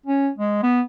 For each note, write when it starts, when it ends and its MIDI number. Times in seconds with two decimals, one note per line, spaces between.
0.06 0.30 61
0.38 0.60 56
0.63 0.82 59